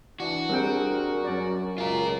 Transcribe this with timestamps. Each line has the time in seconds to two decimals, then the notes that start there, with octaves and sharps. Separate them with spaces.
0.20 E3 D4 F#4
0.49 G3 C4 D4 G#4 A#4 G5
1.25 F#2 C#4 D5
1.78 C#2 F#3 F4 A#4